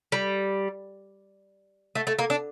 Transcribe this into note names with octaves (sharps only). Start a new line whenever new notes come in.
G3
A3
A3
A#3
D4